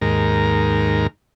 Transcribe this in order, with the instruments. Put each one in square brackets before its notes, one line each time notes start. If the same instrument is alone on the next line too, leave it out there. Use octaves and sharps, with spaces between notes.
[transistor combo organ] D#2 G#2 A#4